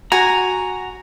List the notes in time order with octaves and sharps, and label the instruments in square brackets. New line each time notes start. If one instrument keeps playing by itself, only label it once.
[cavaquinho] F#4 G#5 [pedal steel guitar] A#5